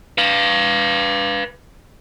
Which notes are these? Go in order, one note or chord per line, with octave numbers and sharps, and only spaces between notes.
B4 F5